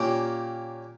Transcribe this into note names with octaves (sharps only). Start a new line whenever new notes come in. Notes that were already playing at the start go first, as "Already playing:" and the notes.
Already playing: A#2 A#3 C#4 G4